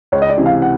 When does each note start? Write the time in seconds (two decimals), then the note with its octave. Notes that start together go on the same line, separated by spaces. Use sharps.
0.12 C#2 C#5
0.22 D#5
0.29 D5
0.38 C3 E3
0.46 F5
0.62 F#5